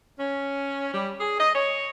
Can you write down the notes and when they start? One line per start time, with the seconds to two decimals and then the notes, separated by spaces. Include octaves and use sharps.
0.18 C#4
0.94 G3
1.20 G#4
1.40 D#5
1.55 C#5